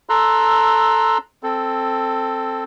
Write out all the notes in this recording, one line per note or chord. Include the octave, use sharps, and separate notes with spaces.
A4 A#5 C6 E6 F#6
C4 A4